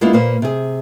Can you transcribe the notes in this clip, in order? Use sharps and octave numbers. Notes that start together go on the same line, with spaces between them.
G#3 A#3 B3 D4 E4 F4
A#2 A#3 B4 C5
C3 G#4